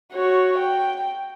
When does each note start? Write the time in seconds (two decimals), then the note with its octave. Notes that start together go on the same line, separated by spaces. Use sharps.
0.13 F#4 C#5
0.59 G5